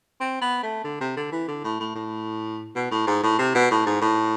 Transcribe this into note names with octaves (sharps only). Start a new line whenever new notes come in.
C4
B3
A3
D3
C3
D3
E3
D3
A2
A2
A2
B2
A2
G#2
A2
C3
B2
A2
G#2
A2